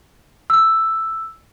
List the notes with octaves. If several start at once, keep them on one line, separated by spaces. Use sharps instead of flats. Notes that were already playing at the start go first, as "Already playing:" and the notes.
E6